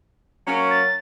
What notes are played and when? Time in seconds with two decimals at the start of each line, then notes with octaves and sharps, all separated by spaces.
0.47 F#3 A#3 C#4
0.70 A6